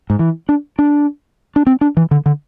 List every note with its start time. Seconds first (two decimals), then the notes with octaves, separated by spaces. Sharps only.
0.10 G#2
0.19 E3
0.49 D4
0.79 D4
1.56 D4
1.67 C4
1.81 D4
1.97 E3
2.11 D3
2.26 D3